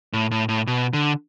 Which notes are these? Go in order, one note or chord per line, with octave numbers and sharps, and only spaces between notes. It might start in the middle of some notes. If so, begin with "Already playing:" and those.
A2
A2
A2
B2
D3